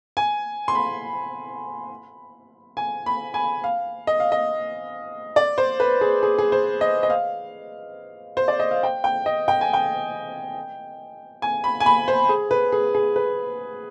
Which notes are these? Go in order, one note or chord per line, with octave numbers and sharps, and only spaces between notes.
G#5
C6
B5
G#5
B5
G#5
F5
D#5
F5
D#5
D5
C5
B4
G#4
G#4
G#4
C5
D#5
D#5
F5
C5
D5
D#5
F5
G5
G5
D#5
G5
G#5
G5
G#5
B5
G#5
B5
C5
G#4
B4
G#4
G#4
B4